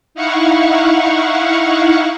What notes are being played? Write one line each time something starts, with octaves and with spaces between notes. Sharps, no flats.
D#4 E4 F5 F#5 C#6